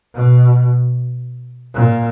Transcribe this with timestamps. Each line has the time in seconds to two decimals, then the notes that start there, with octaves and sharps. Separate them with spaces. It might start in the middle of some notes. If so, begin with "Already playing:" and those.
0.15 B2
1.74 A#2